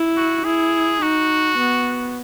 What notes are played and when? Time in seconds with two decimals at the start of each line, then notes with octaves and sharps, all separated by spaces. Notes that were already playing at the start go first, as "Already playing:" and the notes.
Already playing: E4
0.17 F#4
0.45 E4 G#4
1.02 D#4 F#4
1.58 B3